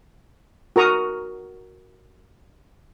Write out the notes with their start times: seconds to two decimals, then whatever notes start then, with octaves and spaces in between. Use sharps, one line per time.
0.76 F#4 A#4 A#5 C#6 D#6